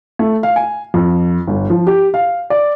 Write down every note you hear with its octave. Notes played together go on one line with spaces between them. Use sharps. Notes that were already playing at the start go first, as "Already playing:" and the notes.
A3
F5
G#5
F2
G1
F3
G4
F5
D5